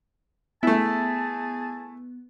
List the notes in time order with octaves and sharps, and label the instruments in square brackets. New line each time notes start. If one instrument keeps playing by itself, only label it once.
[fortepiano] A3 E4 [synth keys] B3 [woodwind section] G#4 G#5 A5